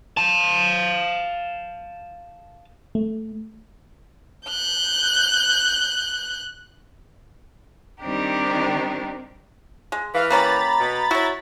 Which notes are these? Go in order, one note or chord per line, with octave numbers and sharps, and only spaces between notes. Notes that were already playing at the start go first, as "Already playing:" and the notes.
F5 A5
A3
F#6 G6
D#3 G3 C4 D4 D#4 G4
G#3
E3 F5
A#3 C#4 G4 A#5 B5 A6
B2
E4 F#4 C#5